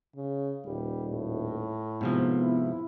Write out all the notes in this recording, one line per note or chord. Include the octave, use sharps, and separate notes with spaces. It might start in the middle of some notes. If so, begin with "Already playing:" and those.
C#3
D#1 G3
A2
G#2 C3 F3 B3
E4